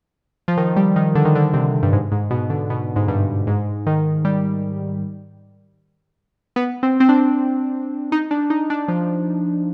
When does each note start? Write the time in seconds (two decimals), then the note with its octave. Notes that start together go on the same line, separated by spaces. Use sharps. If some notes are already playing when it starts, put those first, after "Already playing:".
0.48 F3
0.57 D#3
0.76 G3
0.96 D#3
1.15 D3
1.25 D#3
1.35 D3
1.54 C3
1.83 G2
1.93 G#2
2.12 G#2
2.31 B2
2.50 D3
2.70 B2
2.96 G#2
3.08 G2
3.47 G#2
3.86 D#3
4.25 G3
6.56 B3
6.83 C4
7.00 C4
7.09 D4
8.12 D#4
8.31 D4
8.50 D#4
8.70 D4
8.88 F3